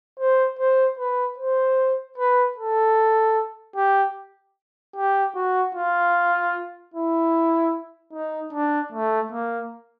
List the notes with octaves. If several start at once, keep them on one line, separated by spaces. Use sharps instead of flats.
C5
C5
B4
C5
B4
A4
G4
G4
F#4
F4
E4
D#4
D4
A3
A#3